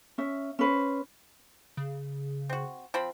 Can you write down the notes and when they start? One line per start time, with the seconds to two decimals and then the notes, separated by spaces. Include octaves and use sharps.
0.18 C#4 E5
0.59 C#4 B4 C5
1.77 C#3
2.50 C4 F#4
2.94 F3 C4 B5